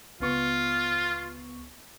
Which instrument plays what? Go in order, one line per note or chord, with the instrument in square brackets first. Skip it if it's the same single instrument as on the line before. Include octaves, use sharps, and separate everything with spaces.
[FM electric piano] C#2 B3 C#6 [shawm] F4